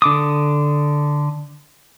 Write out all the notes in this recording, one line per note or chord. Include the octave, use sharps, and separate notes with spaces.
D3 D6 D#6